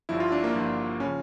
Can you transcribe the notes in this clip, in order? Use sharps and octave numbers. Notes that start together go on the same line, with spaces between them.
G1 G2 F3 E4
F4
D4
A#3
G1 G2 F3
C#3 F3 C#4